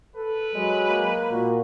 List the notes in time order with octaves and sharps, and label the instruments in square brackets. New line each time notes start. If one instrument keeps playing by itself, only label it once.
[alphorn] A4 [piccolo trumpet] B4
[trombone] F#3 [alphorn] G#3
[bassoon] A#3
[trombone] A#2 [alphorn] F#4